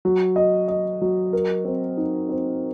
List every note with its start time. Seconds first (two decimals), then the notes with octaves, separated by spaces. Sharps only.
0.05 F#3
0.36 D#5
0.68 D#5
1.02 F#3
1.33 A#4
1.65 C4
1.97 D#4
2.29 C4